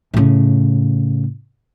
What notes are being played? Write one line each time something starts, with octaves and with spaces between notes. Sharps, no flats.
A2 C#3